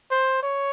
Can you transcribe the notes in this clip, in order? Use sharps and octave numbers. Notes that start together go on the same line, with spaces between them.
C5
C#5